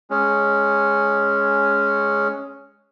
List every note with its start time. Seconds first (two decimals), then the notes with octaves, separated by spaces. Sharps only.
0.10 G#3 C#4